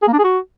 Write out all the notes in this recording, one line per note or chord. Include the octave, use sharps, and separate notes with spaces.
G#4
A#3
D4
G#4
F#4